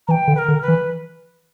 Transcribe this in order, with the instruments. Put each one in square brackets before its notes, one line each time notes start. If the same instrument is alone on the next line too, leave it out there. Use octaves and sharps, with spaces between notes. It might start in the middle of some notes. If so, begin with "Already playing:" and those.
[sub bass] E3 [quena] G5 A#5
[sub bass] D3
[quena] B4
A#4
[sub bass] D3
[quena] B4
[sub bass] E3